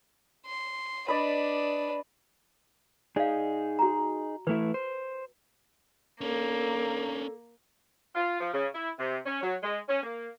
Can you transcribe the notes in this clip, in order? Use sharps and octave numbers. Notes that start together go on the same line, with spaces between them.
C6
D4 B4 D5 D#5 B5
D#4 G#4 D5 F5
F#4 A#5
E3 A3 E4 B4
C5
A#3 C#4 D4 A4
F4
F3
C#3
E4
C3
C#4
F#3
G#3
C#4
A#3